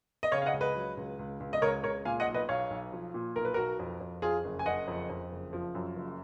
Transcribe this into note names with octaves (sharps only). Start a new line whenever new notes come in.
D#5
C#3 C#5 F5
F5
D#5 F#5
C#2
B4 D#5
F#3
C#2
C#2
C#2
D#5
C#2 A#4 C#5
C#2 A#4 C#5
A#2 F5 G#5
D#5 F#5
B1
B4 D#5
B1 C#5 F5
B1
F3
A#2
B1 A#4
B4
B1 F#4 A#4
F2
F2
F2 F4 G#4
F#1
G#5
F#1 D#5 F#5
F2
F2
F#1
F3
F#2
F#1